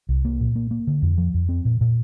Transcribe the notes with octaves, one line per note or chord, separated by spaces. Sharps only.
C2
A#3
A#2
A#3
A#3
D3
F2
F3
F2
C4
A#2
A#2